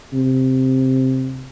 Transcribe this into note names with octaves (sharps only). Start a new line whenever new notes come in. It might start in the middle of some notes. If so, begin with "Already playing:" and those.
C3